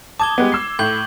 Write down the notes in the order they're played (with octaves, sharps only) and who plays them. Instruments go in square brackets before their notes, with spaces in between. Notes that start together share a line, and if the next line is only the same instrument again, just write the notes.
[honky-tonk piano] A5 D#6 [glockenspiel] D6 G#6 G7
[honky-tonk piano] G3 G#3 B3
E6 C7
[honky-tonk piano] A2 [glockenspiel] G6 F#7 G7